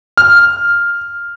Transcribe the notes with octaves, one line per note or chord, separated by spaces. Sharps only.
F6